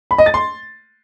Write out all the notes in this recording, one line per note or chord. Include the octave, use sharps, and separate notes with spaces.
B5
D#5
A6
C6